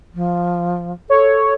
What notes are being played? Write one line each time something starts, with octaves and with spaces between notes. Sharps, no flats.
F3
A4 C#5